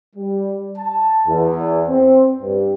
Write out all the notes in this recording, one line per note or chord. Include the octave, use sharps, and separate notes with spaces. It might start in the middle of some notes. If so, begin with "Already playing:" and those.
G3
A5
E2
C4
G2